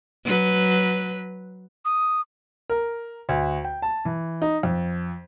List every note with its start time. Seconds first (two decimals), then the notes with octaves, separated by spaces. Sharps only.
0.25 F#3 B4
1.85 D#6
2.70 A#4
3.29 D2
3.64 G5
3.82 A5
4.05 E3
4.42 D#4
4.63 F2